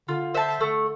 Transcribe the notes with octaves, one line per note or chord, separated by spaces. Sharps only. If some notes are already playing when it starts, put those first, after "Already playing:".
D3 F4
C5 E5 A5
D3 A3